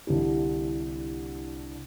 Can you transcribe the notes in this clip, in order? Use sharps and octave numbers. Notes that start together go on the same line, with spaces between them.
C2 D3 E4 G4